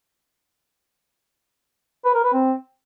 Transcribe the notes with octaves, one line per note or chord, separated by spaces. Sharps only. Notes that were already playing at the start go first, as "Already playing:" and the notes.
B4
A#4
B4
C4